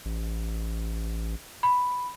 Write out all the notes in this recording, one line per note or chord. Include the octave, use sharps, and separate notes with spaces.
A1
B5